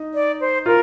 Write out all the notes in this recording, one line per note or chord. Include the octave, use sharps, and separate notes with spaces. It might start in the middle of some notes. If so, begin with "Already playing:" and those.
Already playing: D#4
D5
C5
F4 A#4